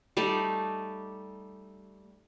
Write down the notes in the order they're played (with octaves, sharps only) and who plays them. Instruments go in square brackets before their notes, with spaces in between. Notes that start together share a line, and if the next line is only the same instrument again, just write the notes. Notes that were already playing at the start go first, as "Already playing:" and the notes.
[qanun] G3 A3 D#4 D5